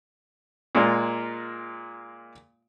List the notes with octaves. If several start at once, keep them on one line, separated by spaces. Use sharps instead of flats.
A#2 G#3 F4 A#4